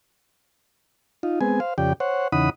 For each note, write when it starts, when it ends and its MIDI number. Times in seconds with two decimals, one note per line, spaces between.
1.23 1.39 63
1.23 1.39 65
1.41 1.60 56
1.41 1.60 59
1.41 1.60 60
1.41 1.60 80
1.60 1.74 72
1.60 1.74 77
1.78 1.93 41
1.78 1.93 49
1.78 1.93 67
1.78 1.93 74
1.78 1.93 79
2.00 2.28 72
2.00 2.28 73
2.00 2.28 78
2.32 2.50 40
2.32 2.50 49
2.32 2.50 63
2.32 2.50 78
2.32 2.50 83
2.32 2.50 87